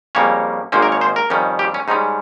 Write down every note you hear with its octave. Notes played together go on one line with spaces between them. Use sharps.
F2 C#3 G3 A#3 C#4 C#5
G#1 G#2 D#3 A#3 C#4 C5
A#4
C#5
C5
A#4
F2 D#3 G3 C#4
G4
C#4
G#2 G3 C#4 D#4